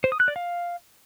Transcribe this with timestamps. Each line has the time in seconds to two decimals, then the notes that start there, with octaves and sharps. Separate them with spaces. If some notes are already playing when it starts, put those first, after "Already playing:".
0.04 C5
0.12 D#6
0.20 F#6
0.28 D5
0.36 F5